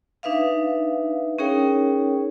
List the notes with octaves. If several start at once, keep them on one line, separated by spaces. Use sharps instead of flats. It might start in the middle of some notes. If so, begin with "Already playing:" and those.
D4 D#4 B4 E5 F5
C#4 D#4 G#4 A#4 C#5 G5